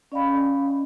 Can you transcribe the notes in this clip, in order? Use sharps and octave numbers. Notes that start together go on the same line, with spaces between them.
C#4 D5 D#5 F5 G5 B5